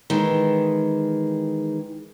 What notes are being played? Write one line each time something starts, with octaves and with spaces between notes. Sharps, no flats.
D#3 E3 G#3